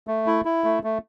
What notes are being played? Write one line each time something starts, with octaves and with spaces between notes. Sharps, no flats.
A3
E4
E4
A3
A3